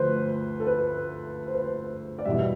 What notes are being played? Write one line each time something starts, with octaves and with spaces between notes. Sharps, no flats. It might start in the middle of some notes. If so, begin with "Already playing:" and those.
Already playing: D2 F3 A3 B4 C5
A4
B4
C5
B4
C5
D5
E2 B2 G3 E5